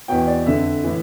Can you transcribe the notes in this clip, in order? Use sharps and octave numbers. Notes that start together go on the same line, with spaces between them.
E2 B2 G5
D5
F2 D3 E5
A2 E3